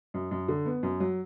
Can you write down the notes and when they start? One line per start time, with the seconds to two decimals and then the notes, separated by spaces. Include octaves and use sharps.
0.14 F#2
0.31 F#2
0.48 D3
0.66 B3
0.83 F#2
1.00 F#3